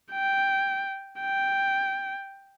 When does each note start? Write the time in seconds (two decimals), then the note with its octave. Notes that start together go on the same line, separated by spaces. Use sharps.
0.12 G5
1.21 G5